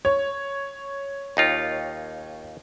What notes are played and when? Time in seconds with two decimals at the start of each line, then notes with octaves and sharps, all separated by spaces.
0.05 C#5
1.37 D#2 D#4 F4